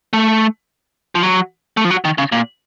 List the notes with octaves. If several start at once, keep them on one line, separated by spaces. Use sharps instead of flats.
A3
F3
F#3
A3
F3
F#3
D#3
C#3
A#2